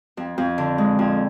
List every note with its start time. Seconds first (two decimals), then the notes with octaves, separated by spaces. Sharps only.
0.17 F2
0.38 F2
0.58 D3
0.78 G#3
0.99 F2